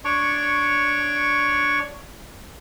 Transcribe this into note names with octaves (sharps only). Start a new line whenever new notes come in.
D4 C#5 D5 C#6